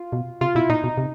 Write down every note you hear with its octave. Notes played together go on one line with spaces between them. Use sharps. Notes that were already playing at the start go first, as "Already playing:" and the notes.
Already playing: F4
B2
C3 F4
B2 E4
A#2 D#4
B2
C3